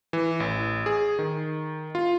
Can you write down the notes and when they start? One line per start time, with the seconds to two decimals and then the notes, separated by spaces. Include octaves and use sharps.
0.13 E3
0.40 A1
0.86 G#4
1.19 D#3
1.95 F4